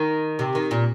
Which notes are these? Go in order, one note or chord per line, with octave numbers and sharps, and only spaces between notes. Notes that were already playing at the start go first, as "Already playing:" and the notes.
Already playing: D#3
C3
D#3
A#2